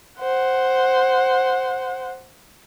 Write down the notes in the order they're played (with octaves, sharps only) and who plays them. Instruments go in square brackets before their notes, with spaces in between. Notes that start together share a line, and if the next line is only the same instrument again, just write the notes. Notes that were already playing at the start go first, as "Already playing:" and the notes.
[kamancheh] C5 F#5